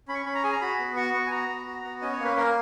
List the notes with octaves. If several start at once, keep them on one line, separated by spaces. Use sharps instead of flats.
C#4 B5
C#6
C#4 B5
A#5
G#4 G#5
A#5
F#4 B5
B3
F#4 C#6
B3 C#6
G#5
F#4 A#5
B3
F#4
B3
C#4 D#5
C#5
A#3
B4
A#3 A#4